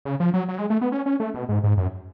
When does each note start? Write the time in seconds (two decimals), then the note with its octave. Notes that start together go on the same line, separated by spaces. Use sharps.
0.05 C#3
0.20 F3
0.34 F#3
0.49 F#3
0.59 G#3
0.70 A3
0.81 B3
0.92 C#4
1.06 C#4
1.20 A3
1.34 B2
1.49 G#2
1.64 G#2
1.77 F#2